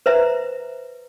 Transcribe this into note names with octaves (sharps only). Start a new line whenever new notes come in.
B4 C5 E5 A#5